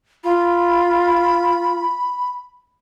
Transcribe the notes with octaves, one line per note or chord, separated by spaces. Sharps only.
F4 B5